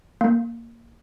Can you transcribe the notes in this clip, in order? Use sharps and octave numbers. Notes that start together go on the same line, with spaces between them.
A#3